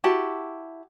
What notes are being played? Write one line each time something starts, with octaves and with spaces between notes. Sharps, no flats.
E4 F#4 G4 A5